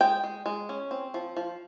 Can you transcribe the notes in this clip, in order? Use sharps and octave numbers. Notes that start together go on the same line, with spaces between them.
G#3 G5
G#3
G#3
C#4
C4
F3
F3